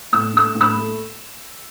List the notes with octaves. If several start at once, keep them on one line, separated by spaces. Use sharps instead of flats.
A2 E6
A3 E6
A2
B5 E6
A3